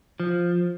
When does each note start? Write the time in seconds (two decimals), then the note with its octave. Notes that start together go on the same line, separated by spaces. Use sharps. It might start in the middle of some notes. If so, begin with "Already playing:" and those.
0.20 F3